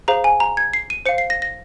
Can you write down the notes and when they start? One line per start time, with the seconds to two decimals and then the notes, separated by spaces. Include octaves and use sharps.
0.08 G#4 C5 F5 A#5
0.24 G#5
0.40 A#5
0.57 G#6
0.73 C7
0.90 D#7
1.06 C5 F5 C#7
1.18 C7
1.30 A#6
1.42 A#6